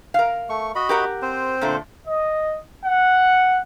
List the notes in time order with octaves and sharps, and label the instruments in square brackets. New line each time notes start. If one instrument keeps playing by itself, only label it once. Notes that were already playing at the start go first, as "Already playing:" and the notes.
[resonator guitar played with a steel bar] A#4 F5
[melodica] A3 C#6
F#4 D#5 B5
[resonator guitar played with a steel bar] G4 A#4 F#5
[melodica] C4 C5
[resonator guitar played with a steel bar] A#2 D3 A3
[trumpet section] D#5
F#5